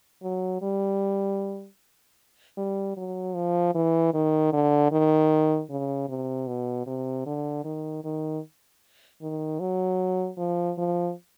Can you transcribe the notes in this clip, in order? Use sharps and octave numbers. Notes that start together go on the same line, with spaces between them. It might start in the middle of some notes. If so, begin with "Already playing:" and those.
F#3
G3
G3
F#3
F3
E3
D#3
D3
D#3
C#3
C3
B2
C3
D3
D#3
D#3
D#3
F#3
F3
F3